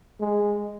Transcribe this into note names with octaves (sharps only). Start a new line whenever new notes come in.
G#3